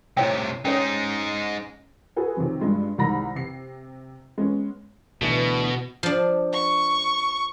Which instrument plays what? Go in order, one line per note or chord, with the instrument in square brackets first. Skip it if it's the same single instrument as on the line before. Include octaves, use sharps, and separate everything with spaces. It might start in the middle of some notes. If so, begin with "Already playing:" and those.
[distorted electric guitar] A2 C3 [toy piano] E4 C#5 G5
[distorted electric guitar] G#3 D#4 [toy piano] C#4 A4 C#5
[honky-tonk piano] F#4 G#4 A4 B4
C3 D#3 F3 F#3 C4
G2 G#3 F4
C2 D#3 G#3 A#5 B5 A#6
C3 C7
G#3 B3 C#4
[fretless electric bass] D2 E3 [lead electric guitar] B2
[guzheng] F3 D4
[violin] C#6